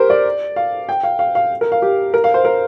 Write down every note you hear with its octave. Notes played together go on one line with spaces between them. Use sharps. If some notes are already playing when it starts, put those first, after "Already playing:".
Already playing: G4 A#4 C5
D5
F5
G5
F5
F5
F5
A#4
F5
G4
A#4
F5
C5
A#4